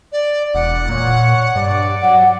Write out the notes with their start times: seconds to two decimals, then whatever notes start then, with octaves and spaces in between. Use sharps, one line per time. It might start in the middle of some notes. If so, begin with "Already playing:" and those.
0.12 D5
0.54 E1 D5 F#5
0.89 A#2 C#5
1.56 G2 D5
2.02 F#3 F#5